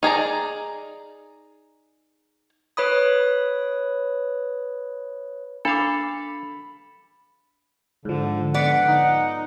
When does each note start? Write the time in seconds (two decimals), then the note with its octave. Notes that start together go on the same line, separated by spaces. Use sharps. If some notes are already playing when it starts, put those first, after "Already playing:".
0.03 D#4 G#4 D5 A#5
2.77 B4 C#5 B5 D#6
5.65 D4 A4 F5 B5 D6
8.05 G#2 D3 F3
8.54 D3 B3 D5 F#5
8.88 D#4